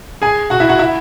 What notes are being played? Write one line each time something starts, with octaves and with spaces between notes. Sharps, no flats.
G#4 G#5
F#4 F#5
E4 E5
F#4 F#5
E4 E5